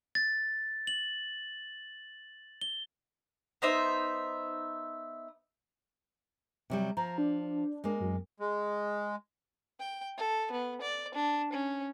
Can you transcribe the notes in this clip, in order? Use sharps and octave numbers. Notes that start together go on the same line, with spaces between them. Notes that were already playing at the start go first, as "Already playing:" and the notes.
A6
F#7
G7
B3 D#4 C5 E5
C3 F#3 G3
F3 A#5
D4
G#3 A#3
F#2
G#3
G5
A4
B3
D5
D4
C#4